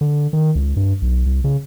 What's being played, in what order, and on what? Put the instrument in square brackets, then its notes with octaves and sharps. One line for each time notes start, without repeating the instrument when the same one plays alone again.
[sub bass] D3
D#3
C#2
G2
B1
C2
C#3